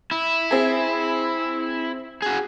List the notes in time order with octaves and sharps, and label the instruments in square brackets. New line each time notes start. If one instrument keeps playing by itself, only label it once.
[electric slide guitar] E4
[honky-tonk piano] C4 G#4
[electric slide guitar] F#4 G#4